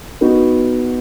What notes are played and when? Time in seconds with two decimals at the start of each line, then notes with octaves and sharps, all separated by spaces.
0.21 B3 D#4 F#4